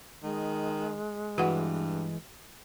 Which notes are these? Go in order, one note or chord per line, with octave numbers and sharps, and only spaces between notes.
D#3 G#3
G2 E3 F#4 B4 F#5